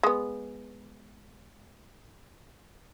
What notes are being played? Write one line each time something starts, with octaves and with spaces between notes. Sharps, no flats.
G#3 B3